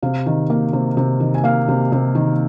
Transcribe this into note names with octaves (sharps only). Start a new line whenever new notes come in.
C3 F5
D#3
A#3
C3
C3
D#3
G#5
A#3 F5
C3
C3
D#3